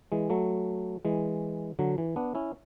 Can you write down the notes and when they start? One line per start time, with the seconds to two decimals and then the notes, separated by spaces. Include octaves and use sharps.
0.12 E3 G#3
0.30 F#3 A3
1.05 E3 G#3
1.79 D3 F#3
1.98 E3
2.16 B3 D4
2.35 C#4 E4